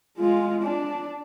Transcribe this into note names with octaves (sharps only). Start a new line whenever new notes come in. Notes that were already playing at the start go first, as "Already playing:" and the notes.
G#3 F4
D4